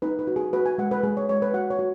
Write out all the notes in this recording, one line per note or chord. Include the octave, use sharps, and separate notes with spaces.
D#4 B4
B4
F#4
G#4
F#4 B4
G#5
G#3 F#5
B4
G#3 G#4
C#5
G#3 C#5
B4
F#4 F#5
C#5
F#4